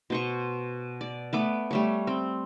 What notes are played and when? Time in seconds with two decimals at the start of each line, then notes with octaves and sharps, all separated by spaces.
0.10 B2 C5 C#6
1.01 D5
1.33 A3 B3 D6
1.71 G3 A3 C#5
2.07 C4